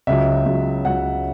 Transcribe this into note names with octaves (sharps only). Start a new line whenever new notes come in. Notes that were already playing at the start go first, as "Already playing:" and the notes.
C#2 C#3 F#3 E5
C#2 C#3 F#3
C#2 C#3 F#3 F#5